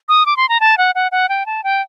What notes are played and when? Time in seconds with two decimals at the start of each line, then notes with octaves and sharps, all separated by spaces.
0.09 D#6
0.26 D6
0.37 C6
0.49 A#5
0.60 A5
0.78 F#5
0.95 F#5
1.12 F#5
1.29 G5
1.46 A5
1.64 G5